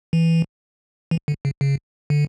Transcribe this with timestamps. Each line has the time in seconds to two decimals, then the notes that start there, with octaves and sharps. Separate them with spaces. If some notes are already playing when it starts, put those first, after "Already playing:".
0.13 E3
1.11 E3
1.28 D3
1.45 C#3
1.61 C#3
2.10 D3